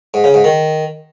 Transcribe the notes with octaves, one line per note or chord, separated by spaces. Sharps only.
G#2
C#3
G#2
D#3